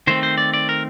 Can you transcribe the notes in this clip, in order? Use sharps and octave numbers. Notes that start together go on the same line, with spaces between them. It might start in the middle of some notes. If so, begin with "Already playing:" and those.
D#3 A3 C4 C5
C5
D5
D5
A#4